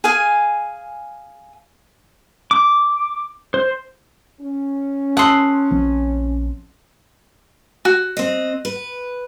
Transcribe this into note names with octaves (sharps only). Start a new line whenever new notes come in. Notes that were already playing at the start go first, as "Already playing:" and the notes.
G#4 F5 G#5
D6
C5
C#4
F#5 A5 C6 D#6 E6
A#1 F3 C4
F#4
C4 D#5
B4